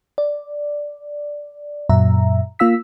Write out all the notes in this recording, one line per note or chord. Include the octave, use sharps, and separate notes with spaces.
D5
F#2 A#2 F#3 E5 A#5
A#3 F4 F5 E6 B6